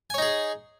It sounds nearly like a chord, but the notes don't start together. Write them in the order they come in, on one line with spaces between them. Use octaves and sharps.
G#5 C#5 D#4 G#4